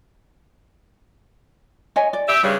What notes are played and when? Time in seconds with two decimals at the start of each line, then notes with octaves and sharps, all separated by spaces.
1.96 C#5 D#5 G#5
2.13 D5
2.27 G4 E5
2.43 G2 C#3 G3 C#5